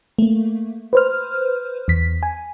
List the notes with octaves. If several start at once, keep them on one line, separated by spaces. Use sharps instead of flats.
A3 A#3
B4 C5 F6
E2 B6
G#5